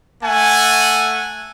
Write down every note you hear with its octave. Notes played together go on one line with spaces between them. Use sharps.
A3 F#5 G#5